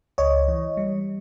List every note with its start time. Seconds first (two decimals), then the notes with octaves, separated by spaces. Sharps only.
0.18 C#2 C#5 D#5
0.48 E3
0.77 G3